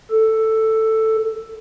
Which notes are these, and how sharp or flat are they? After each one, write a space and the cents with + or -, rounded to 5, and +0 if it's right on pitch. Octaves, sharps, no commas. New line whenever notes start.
A4 +5